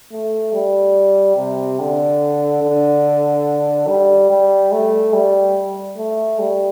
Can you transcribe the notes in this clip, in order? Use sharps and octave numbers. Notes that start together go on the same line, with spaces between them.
A3
G3
C3
D3
D3
G3
G3
A3
G3
A3
G3